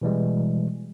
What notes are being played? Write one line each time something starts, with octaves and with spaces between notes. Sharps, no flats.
B2 E3 G3 G#3